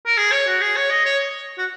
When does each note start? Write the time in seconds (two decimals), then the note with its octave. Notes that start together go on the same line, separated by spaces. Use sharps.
0.06 A#4
0.17 G#4
0.31 C#5
0.47 F#4
0.61 G#4
0.76 C#5
0.90 D#5
1.05 C#5
1.58 F#4